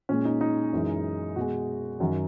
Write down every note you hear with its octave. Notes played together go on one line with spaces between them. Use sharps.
A#2 G#3 C#4
D#4
D#4
F#2 E3 G#3
B2 G#3 F#4
F#2 D#3 F#3 F#4